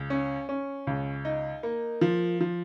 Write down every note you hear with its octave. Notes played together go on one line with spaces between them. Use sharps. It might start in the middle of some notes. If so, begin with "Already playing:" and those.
Already playing: C#2
C#4
C#4
C#2
D#4
A#3
F3
F3